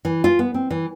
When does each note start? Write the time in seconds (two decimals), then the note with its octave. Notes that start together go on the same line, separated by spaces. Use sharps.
0.05 E3
0.24 F4
0.39 B3
0.54 C4
0.71 E3